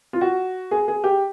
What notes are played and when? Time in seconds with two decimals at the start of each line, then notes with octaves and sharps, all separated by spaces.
0.13 F4
0.21 F#4
0.71 G#4
0.88 G#4
1.04 G4